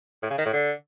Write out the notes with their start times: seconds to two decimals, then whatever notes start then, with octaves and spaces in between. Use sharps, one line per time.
0.23 A2
0.30 C#3
0.38 D#3
0.46 A2
0.53 D3